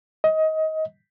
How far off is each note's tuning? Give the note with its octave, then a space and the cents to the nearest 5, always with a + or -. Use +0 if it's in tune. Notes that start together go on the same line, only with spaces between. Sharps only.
D#5 +20